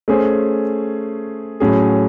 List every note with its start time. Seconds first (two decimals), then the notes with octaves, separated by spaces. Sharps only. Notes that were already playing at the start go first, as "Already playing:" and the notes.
0.08 A3 C#4 G#4 C5
1.60 A2 F#3 C#4 G#4